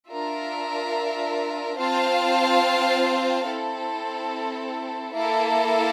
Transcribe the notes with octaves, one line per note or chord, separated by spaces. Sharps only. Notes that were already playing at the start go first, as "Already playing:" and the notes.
D4 F4 A#4 E5
C4 F4 C5 F5 A5
C4 E4 A4
A#3 E4 A4 E5